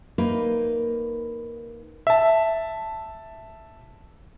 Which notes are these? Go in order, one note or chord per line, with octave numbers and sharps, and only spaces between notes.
A#3 D#4 B4
E5 A5